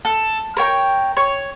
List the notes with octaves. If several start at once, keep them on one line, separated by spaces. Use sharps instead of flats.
A4
A#4 C#5 G5
C#5